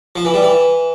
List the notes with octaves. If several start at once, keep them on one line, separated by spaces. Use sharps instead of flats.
F3
E3
G3
E3